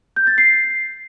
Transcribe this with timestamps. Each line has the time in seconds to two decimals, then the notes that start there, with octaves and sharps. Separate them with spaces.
0.16 G6
0.27 A6
0.38 C7